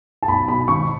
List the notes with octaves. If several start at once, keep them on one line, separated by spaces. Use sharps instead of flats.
A5
B1 B5
B2 B5
G#1 C#6